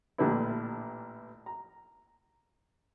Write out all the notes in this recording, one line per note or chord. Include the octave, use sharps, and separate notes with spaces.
A1 A#2 D3 G3 B3 E4
A#5